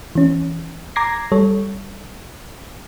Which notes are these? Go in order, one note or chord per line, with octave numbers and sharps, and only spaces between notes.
E3 C#4
A#5 D6 G#6 A#6 C7
G3 A4 C#5